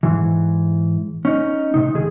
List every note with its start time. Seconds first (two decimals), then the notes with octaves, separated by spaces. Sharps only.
0.03 G#2 E3
1.25 C#4 D#4
1.74 A2 C3 D#4
1.94 C#2 D#3 G#4